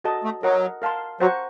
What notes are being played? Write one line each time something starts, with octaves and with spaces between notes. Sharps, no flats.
F#4 A4 D#5 A5
A3
F#3 A#4 D#5 F#5 A#5
A#4 F5 A5 C6
F#3 C5 F#5 A#5 C#6